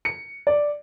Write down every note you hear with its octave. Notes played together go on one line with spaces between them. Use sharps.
C#7
D5